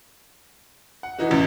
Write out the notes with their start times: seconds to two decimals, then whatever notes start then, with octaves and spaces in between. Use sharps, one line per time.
1.03 F#5
1.19 E3 D#4 F#4 B4
1.31 A1 E2 C#4